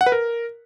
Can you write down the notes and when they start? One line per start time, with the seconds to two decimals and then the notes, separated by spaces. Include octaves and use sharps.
0.01 F#5
0.06 B4
0.12 A#4